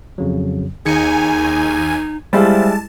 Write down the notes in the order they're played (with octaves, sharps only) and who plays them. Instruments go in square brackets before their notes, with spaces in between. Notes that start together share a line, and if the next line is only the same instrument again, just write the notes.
[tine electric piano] F2 C#3 F#3
[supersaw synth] D#2 G#5 [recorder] D#4 [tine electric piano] G#4 G#6 C#7
[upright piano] G3 G#3 E4 [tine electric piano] C5 E5 F5 [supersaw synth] A5